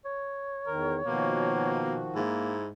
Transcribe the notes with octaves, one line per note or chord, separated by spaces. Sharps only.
C#5
E2 D#3 A#4
B2 D#3 F3 A#3 F#4
G#2 A#3 E4